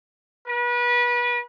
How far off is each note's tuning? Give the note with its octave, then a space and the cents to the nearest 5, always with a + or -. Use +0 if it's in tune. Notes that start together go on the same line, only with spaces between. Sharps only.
B4 -30